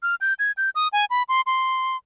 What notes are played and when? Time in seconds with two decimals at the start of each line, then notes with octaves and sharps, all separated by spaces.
0.03 F6
0.21 G6
0.39 G#6
0.57 G6
0.75 D#6
0.93 G#5
1.10 B5
1.29 C6
1.46 C6